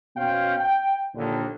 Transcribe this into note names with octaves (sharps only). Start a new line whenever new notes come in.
B2 B3 C#4 C5 F5 G5
G5
A#1 D#2 D3